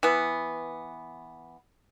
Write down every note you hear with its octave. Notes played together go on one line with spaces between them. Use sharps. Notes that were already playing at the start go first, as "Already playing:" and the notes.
E3 B3